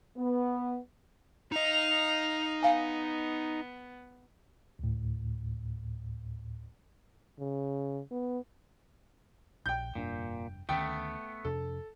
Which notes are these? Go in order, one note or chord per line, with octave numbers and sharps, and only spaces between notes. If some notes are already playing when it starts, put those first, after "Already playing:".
B3
D#4 D#5 F5 F7
B3 F5 G#5
D2 A2
C#3
B3
A#1 G5 G6
F1 G2 A#2 D4
D2 D#3 A3 B3 C#4 G5
F2 C3 D4 A4